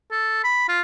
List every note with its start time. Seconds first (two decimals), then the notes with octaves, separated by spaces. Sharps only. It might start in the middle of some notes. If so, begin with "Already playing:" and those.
0.11 A4
0.44 B5
0.69 F4